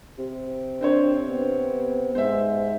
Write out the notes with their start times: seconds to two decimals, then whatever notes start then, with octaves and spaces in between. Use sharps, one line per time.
0.18 C3
0.81 C4 D4 C5 C#5
1.27 B3
2.15 G#2 C5 E5